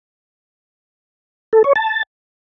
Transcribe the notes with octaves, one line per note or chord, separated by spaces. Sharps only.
A4
C#5
A5